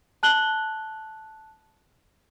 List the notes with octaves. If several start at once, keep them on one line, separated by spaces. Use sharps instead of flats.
A5 F#6 F#7 G7